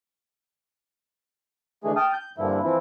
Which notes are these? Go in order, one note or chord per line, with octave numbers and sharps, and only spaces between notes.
D3 E3 G#3 A3 G#4
G5 A5 D#6 F6
G6
G2 A#2 D3 F3 E4
E3 F3 C4 E4